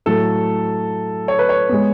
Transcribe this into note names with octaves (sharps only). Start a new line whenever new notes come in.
A2 F#3 A3 A4
C#5
B4
C#5
G#3 B3